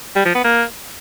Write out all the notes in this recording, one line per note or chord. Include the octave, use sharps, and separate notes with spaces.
G3
F3
B3
A#3